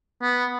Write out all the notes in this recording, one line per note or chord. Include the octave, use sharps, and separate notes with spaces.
B3